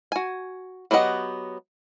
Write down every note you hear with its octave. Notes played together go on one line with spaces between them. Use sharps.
F#4 G#5
F#3 B3 G4 D#5 F#5